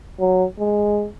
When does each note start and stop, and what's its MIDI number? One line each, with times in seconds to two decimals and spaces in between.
0.20 0.44 54
0.59 1.07 56